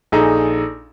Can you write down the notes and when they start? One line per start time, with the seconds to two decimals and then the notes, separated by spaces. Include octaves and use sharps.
0.12 A#1 D#4 G#4 A4 A#5